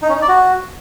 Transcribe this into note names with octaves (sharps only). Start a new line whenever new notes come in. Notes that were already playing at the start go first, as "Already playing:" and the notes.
D#4
C#4
D#4
D5
F#4